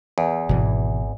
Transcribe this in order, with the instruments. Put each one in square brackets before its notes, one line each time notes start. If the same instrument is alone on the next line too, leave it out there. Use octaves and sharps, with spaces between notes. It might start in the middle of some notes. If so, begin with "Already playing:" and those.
[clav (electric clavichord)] E2
[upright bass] G#1 [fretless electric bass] B2 E3